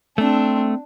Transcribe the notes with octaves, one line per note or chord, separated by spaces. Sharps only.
A3 C4 D4